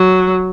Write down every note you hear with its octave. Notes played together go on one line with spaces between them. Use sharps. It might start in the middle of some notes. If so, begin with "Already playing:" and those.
Already playing: F#3